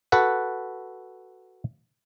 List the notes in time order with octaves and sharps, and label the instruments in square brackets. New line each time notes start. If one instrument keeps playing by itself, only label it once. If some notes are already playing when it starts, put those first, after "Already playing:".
[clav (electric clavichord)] F#4 A4 B4 F#5